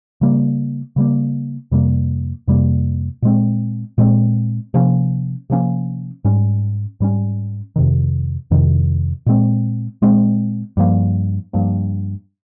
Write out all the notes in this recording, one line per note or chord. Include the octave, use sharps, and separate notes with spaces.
C#3 G3 A#3
C#3 G3 A#3
F2 C3 G3 A#3
F2 C3 G3 A#3
A#2 G#3 C4
A#2 G#3 C4
C3 F3 A#3 C#4
C3 F3 A#3 C#4
G#2 G3 C#4
G#2 G3 C#4
F2 C3 D#3
F2 C3 D#3
A#2 G#3 C4
A#2 G#3 C4
G2 F3 A#3
G2 F3 A#3